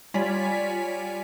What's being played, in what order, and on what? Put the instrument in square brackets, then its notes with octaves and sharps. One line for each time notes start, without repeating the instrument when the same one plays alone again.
[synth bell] G3 F4 C#5 D5 G#5 B6